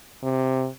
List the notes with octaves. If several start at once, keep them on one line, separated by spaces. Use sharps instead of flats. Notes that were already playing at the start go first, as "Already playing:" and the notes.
C3